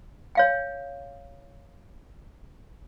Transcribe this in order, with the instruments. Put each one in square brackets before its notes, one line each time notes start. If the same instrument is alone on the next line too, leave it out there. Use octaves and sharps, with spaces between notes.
[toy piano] C#5 F5 G5